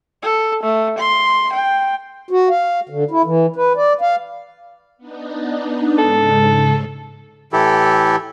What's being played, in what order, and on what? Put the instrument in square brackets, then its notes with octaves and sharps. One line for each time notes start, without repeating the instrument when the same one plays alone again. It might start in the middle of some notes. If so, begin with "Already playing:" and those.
[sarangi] A4
A3
C6
G5
[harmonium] F#4
F5
D3
E4
E3
B4
D5
F5
[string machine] B3 D4 D#4
[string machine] G#2 C#3 G#3 [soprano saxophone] A4
[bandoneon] A2 E3 E4 G4 A4